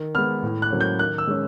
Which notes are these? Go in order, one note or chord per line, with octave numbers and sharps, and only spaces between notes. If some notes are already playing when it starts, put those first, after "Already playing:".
Already playing: D#3
G#3 B3 F6
A2
F#6
F#3 A#3 C#4
G6
D#3 F#6
E6
G#3 C#4